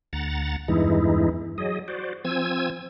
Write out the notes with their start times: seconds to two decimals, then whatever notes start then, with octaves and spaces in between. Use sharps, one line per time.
0.13 D2 F#5 A#5 A6
0.68 E2 G2 E3 G#3 D#4 E4
1.58 F#3 G#4 D#5
1.88 F#4 C5 D5
2.25 F3 C4 G#5 E6 G#6